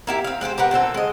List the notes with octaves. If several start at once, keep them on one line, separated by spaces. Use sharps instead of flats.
A#3 E4 G4
C4 F5
G#3 C4 G4 C5
G4 A#4 B4 F#5
A#2 D3 C4 A4
G#3 D#5